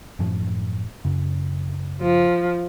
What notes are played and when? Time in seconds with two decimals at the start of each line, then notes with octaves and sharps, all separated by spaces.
0.19 F#2 A2 F3
1.05 F#2 C#3
2.01 F3